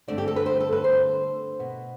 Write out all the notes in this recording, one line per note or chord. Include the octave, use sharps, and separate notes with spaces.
G2 D3 A3 C4 D5
G4
A4
B4
C5
A4
B4
C5
B2 B3